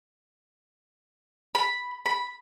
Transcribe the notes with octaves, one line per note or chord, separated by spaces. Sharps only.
B5
B5